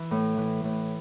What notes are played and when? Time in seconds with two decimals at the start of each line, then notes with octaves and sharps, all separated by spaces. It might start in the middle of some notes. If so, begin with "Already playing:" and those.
Already playing: E3 E4 E5
0.11 A2
0.38 E3
0.64 A2